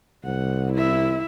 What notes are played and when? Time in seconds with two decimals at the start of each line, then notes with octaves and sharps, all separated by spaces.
0.25 C2 F#5
0.74 E4 E5